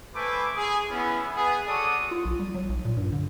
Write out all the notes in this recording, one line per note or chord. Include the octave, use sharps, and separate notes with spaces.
A3 B4 C5 G#5 B5 D6
G#4
B3 C#4 E4
B3 G#4
F#4 A4 C#5 D5 D#6
F4
B1
G3
F#3
B1
A#2
G2
D3